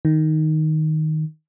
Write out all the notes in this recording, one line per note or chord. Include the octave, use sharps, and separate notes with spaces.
D#3